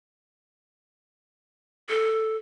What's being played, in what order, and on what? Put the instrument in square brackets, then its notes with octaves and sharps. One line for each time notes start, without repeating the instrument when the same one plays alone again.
[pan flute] A4